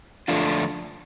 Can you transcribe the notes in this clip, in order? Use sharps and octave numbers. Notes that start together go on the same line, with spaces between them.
D3 F3 A3 D4 F4